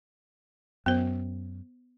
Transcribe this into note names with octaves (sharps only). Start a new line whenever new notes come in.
F#2 B3 C5